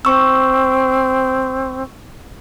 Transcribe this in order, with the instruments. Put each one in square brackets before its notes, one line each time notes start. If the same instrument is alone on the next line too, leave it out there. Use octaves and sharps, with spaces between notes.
[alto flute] C4 [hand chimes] C#6 E6